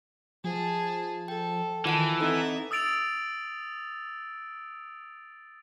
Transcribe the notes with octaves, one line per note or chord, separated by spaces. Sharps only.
F3 G#4 A5
A4 G5
D#3 E3 F4 F#5 G#5 A5
C4 D#4 A4 E5
D#6 E6 A6 D7 F7